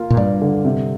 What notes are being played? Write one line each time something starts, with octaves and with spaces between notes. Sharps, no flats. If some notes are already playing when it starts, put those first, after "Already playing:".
Already playing: A#3 F4
A#2
G2 D5
D3
C3